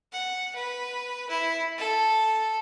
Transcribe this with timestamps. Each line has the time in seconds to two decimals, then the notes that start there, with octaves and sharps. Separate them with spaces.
0.12 F#5
0.55 B4
1.29 E4
1.78 A4